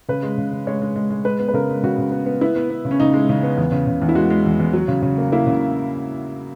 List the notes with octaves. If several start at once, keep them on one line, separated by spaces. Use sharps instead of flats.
C#3 B4
G#3
C#3
C#3
G#3 C#5
G#3
G#3
G#3
G#3 B4
B3
B4
C#3 A#4
G#3
C#3 F#4
C#3
B3
B3
B3 E4
B3
B3
C#3
C#4
C#3 D#4
G#3
C#3
B3
E2
C#3
C#3
E2
E4
G#3 F#4
G#3
E2
E2
F#3
C#3
C#3
A#3
A#3 E4
C#3